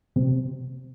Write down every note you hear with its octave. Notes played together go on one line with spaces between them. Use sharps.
C3